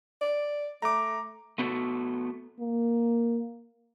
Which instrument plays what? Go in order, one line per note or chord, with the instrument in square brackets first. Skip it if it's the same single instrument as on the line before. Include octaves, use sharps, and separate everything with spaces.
[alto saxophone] D5
[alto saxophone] A3 [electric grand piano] A#5 D6
[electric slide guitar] A3 B3 F#4 G4 A4
[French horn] A#3